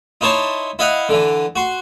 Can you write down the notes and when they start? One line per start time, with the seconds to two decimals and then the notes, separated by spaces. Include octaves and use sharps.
0.21 D#4 E4 C5 C#5 A5 C6
0.79 E4 D#5 F5 F#5
1.09 D3 E3
1.56 F#4 C6